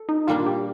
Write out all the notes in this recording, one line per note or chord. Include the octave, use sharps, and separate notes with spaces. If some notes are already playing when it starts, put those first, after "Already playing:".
Already playing: A4
D#4
A#2 G3 A#3 D4 F4
G4